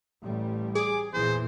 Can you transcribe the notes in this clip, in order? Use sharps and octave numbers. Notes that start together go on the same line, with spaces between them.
A1 A2 G3
G#4 D6
E2 A#2 E3 C5